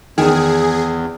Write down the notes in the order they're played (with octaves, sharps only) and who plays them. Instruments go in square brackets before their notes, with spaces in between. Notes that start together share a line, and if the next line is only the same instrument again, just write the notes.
[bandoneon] E2 [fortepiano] D#3 [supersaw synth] G#4